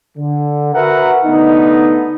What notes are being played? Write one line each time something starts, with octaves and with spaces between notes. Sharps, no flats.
D3
F#4 A#4 B4 E5 F#5
D3 A3 B3 D#4